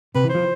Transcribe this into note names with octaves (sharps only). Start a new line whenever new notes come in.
C3 B4
E3
C5
F3